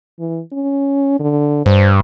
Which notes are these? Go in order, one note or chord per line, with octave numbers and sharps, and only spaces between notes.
E3
C#4
D3
G2 C5